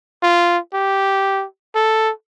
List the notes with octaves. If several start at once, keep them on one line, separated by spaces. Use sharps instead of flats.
F4
G4
A4